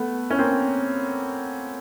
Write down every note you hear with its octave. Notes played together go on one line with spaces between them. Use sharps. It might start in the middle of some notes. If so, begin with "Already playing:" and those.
Already playing: A3 B3
C#4
A#3 C4